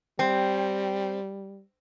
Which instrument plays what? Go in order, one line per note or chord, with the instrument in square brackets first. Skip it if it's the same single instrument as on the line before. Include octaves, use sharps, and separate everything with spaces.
[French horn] G3 [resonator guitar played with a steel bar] C4